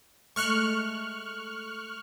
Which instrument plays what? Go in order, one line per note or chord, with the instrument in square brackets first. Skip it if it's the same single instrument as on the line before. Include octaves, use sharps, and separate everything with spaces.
[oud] G#3 A3 [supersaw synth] C#6 F6 F#6